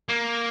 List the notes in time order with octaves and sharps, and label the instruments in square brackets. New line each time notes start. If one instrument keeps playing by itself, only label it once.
[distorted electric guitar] A#3